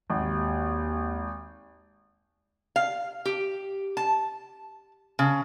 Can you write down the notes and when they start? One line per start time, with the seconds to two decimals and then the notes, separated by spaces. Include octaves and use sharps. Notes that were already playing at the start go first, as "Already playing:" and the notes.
0.10 G#1 D#2
2.76 F5
3.25 G4
3.97 A5
5.19 C#3